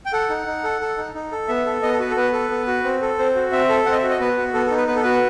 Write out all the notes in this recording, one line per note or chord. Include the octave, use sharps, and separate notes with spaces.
G5
A4 F#5
D#4
D#4
A4
A4
D#4
D#4
A4
B3 E5
A4
B3 D#5
A4
F#4 B4
A4
B3 B4
A4
B3
F#4
C4
A4
C4 C5
F#4
C4 E5
A4
C4 F#5
D#5
E5
F#4
D#5
B3 B4
F#4
B3 A4
A4
D#4
B4
B3 B4
A4
F#4 B4